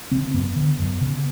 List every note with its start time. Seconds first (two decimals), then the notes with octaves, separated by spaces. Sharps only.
0.11 C#3 C4
0.34 F#2 B3
0.56 D3
0.79 F#2
1.01 C#3